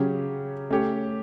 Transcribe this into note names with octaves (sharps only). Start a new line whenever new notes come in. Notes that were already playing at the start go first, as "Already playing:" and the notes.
Already playing: C#3 F#3 C#4 G4
A3 C#4 G4 C#5